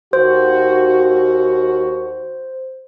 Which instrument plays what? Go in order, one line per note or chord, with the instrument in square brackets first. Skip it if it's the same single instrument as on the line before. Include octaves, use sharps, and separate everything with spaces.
[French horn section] D#2 F#4 [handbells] C5